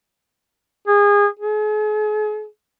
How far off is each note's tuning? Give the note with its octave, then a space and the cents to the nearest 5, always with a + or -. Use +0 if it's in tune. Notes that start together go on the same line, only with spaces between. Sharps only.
G#4 -25
G#4 +40